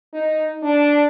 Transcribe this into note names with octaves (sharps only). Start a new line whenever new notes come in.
D#4
D4